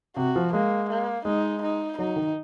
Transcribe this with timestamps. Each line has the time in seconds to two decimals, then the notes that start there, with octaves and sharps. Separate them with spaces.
0.16 C3 F#4
0.36 F3
0.53 G#3 A#3
0.89 A#3
1.25 G#3 D#4
1.62 D#4
1.98 F#3 D#4
2.16 D#3